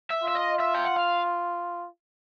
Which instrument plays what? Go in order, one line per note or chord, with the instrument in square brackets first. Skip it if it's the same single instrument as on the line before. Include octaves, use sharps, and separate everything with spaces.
[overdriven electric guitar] E5
[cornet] F4 [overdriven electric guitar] E5
[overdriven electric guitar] D#5
E5
G5
F#5
F5